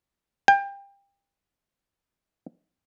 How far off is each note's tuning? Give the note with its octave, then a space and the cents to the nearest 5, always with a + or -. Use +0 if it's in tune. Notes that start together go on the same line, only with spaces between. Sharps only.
G5 +25